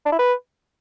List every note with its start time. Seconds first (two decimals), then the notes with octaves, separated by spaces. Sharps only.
0.06 D4
0.12 E4
0.19 B4